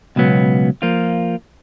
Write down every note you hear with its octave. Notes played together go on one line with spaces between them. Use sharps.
C#2 B2 F#3 B3
F3 A#3 F4